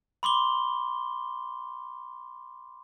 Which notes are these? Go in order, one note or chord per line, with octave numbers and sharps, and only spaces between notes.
B5 C6 D6 G7